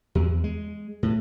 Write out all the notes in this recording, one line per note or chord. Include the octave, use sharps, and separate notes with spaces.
E2
G#3
A2